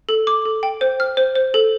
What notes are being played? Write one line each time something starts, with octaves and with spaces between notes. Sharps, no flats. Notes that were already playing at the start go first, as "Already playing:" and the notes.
A4
D6
A4
G5
C5
F6
C5
C5
A4